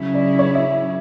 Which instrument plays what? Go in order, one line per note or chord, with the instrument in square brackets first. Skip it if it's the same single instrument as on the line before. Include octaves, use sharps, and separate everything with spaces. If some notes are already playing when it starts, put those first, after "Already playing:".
Already playing: [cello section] C#3 F#3 C#4 E4
[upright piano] D5
C#5
E5